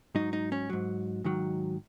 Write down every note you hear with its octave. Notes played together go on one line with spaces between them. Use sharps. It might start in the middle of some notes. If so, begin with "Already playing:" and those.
G#2 F#3 D#4
D#4
C#4
G#2 F#3
G#2 D#3 F#3